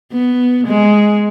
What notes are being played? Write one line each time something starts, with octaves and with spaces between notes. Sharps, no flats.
B3
G#3